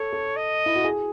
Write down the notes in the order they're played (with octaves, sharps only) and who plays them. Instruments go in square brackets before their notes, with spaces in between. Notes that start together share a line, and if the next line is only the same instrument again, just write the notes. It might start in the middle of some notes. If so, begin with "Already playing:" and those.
Already playing: [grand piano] A4 [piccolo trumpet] C#5
[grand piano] A4
[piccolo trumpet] D#5
[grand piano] E4
F#4
G#4